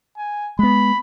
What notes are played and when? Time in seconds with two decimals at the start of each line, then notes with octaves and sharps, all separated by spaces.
0.17 G#5
0.59 G#3 B3 B5